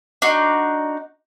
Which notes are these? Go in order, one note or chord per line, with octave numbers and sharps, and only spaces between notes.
D4 D#4 F#4